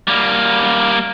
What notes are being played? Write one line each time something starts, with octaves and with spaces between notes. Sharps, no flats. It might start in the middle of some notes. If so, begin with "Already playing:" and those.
G3 A#3